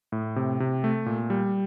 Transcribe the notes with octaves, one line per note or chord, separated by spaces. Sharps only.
A2
C3
C3
A3
A#2
G3